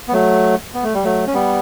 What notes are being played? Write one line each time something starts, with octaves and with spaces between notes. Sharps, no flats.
B3
F#3 A3
B3
A3
G3
F#3 A3
C#4
G3 B3